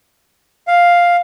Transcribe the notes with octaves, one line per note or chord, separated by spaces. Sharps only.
F5